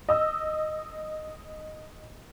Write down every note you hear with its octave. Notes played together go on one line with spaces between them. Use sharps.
D#5 E6